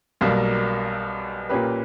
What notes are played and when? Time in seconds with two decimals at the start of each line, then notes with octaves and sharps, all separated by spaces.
0.21 B1 B2 G3 A#3
1.49 A#2 A#3 C#4 G4 B4